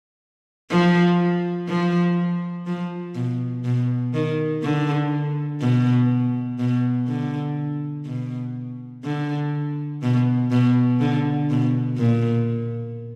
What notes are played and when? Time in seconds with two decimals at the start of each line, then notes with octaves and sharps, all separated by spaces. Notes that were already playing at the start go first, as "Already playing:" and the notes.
0.70 F3
1.68 F3
2.66 F3
3.15 B2
3.65 B2
4.14 D#3
4.63 D3
5.61 B2
6.60 B2
7.08 D3
8.06 B2
9.05 D3
10.03 B2
10.51 B2
11.00 D3
11.50 B2
11.98 A#2